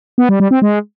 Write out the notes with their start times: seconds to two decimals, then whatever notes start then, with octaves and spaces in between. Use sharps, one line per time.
0.18 B3
0.29 G3
0.40 G3
0.51 C4
0.62 G#3